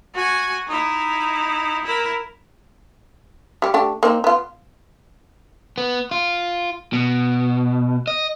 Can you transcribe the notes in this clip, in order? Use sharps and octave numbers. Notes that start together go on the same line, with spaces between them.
F#4 G#5
D#4 E4
E4 A#4
G3 G4
A3 D4 G4
A#3 C4 D#4
B3 F4
B3
F4
B2
D#5